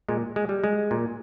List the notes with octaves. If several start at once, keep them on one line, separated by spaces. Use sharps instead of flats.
A#2 G#3
G#3
G3
G#3
A#2